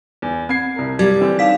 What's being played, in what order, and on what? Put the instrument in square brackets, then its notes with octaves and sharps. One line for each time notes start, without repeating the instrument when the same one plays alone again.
[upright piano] E2
[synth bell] C4 [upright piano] G#6 C7
[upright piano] C2 A#4
[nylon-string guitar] G3 [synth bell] G#6
[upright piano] D3 E3 C4
[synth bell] D#4 F5 B6